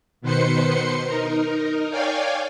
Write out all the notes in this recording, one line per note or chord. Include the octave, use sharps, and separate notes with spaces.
B2 D#3 B4 C5 C6 C#7
D#4 A#4
C#5 D5 F5 G5 G#5